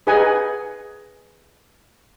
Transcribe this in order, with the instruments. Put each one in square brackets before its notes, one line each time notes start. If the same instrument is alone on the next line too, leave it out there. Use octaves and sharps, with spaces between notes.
[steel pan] D#4 G#4 B4 D#5 F#5 G#5